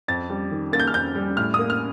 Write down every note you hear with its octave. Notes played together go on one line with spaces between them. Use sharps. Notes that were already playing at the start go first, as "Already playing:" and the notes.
F2 A6
G3
D#3
A#3 A6
G6
F6
F2 G6
G3
A2 F6
A#3 D#6
F6